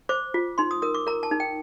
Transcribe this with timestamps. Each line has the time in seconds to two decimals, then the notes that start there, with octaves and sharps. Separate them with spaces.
0.09 C5 D6
0.34 F4
0.58 D#4 C6
0.71 D#6
0.82 A#4 D#6
0.94 D6
1.07 A#4 A#5
1.23 A5
1.31 D#4
1.40 G5